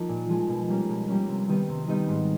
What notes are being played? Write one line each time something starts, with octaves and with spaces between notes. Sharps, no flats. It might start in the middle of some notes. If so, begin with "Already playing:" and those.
Already playing: F3 A#3 D#4
A#2
F3 G#3
B2
G3 A#3 C#4
B2
G3 A#3 C#4
C3
D#3 G3 B3 D#4
C3
D#3 G3 B3 D#4
G#2